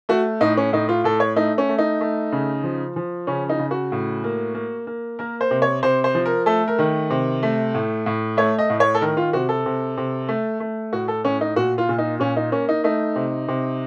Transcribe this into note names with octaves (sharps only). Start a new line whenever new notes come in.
A3 F#4
A2 D#4
C#4
A2 D#4
F4
A2 A4
C#5
A3 D#4
C#4
A3
D#4
A3
C#3
F3
F3
C#3 C#4
D#4
C#3
F#4
A2
A#3
A#3
A#3
A#3 A#4
C5
C3
C#5
C3 C5
C5
F3
A#4
A3 A4
A#4
D#3
C3
A3
A2
A2
A3 C#5
D#5
A2
C#5
A4
D#3 A#4
F4
C3 F#4
A4
C3
C3
A3
A3
A2 F#4
A4
A2 C#4
D#4
A#2 F#4
F4
A#2
D#4
A#2 C#4
D#4
A#3 C#4
D#4
A3 D#4
C3
C3